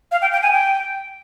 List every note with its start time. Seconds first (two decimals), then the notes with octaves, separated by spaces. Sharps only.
0.12 F5
0.22 G5
0.33 G5
0.43 G#5
0.53 G5